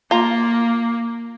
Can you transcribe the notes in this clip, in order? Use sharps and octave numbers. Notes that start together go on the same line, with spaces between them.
A#3 F4 A#5